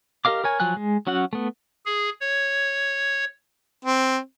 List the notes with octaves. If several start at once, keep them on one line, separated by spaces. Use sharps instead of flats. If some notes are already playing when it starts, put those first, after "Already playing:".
G4 A#4 D#5 F5 D6
A#4 C#5 G#5
F3 F#3 G#5 F#6
G#3
F#3 C#4 F#4 F#5
A3 B3
G#4
C#5
C4